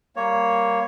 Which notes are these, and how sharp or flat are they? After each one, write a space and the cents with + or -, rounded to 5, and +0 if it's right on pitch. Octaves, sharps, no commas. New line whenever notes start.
G3 +0 A#3 +0 C#5 +0